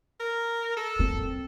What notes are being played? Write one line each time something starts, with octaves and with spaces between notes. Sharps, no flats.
A#4
A4
C4